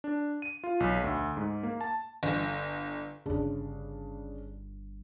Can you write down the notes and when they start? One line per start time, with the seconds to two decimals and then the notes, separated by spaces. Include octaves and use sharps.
0.04 D4
0.42 D#7
0.64 F4
0.80 B1
1.04 D2
1.37 G#2
1.63 A#3
1.81 A5
2.23 G1
3.26 G1 G2 C#3 D4